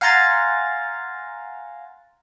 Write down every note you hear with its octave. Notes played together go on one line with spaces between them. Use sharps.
F5 F#5 G#5 A#5 C6 A6